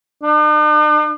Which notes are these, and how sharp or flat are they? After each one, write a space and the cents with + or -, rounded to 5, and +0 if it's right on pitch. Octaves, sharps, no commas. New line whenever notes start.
D4 +45